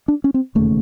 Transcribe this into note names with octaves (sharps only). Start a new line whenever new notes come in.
D4
C#4
C4
E1 D#2 C#3 A3